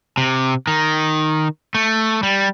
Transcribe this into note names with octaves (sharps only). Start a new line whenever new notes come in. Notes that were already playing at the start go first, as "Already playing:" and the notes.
C3
D#3
A3
G3